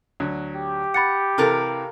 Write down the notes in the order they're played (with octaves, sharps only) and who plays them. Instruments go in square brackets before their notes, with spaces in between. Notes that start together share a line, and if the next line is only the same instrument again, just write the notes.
[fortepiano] D2 F#3
[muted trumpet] G4
[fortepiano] F#5 [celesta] B5 A6 C#7
[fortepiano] C3 E3 [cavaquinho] A4 A#4 F5